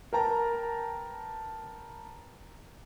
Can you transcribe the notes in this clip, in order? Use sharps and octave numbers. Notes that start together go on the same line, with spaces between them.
A#4 B4 G5 A5 A#5